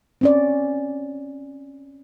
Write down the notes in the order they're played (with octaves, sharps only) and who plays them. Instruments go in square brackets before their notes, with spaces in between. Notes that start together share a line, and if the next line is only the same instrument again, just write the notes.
[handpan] C4 C#4 D5